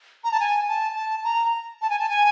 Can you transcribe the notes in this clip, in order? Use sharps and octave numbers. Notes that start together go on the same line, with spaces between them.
A#5
A5
G#5
A5
A5
A#5
A5
G#5
A5
G#5